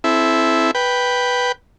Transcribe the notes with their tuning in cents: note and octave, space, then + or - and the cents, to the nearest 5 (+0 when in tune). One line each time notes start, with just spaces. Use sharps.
C4 +0 E4 +0 A4 -30
B4 -5 G5 +0